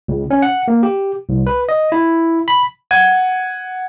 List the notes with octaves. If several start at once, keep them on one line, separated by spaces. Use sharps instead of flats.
C#2
C#4
F#5
A#3
G4
C2
B4
D#5
E4
B5
F#5 G#6 D#7